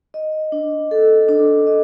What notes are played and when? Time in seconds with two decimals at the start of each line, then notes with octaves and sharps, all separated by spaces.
0.14 D#5
0.52 D4
0.91 A4
1.28 D4
1.67 D#5